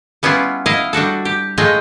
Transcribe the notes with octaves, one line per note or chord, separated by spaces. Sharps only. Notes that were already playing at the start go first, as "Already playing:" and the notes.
G3 B3 C#4 E4 F4
E4 D#5 F5
G3 D4 F#4 A4
G4
A2 G#3 A3 F4 D#5 G5